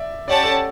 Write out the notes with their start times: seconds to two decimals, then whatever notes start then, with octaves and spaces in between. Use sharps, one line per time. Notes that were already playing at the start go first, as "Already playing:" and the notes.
Already playing: D5 E5
0.28 C#4 G4 C#5 D5 F#5 A5
0.43 A4